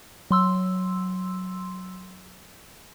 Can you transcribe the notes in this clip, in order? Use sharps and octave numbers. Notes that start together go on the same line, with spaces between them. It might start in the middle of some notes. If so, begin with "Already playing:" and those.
F#3 C6 E6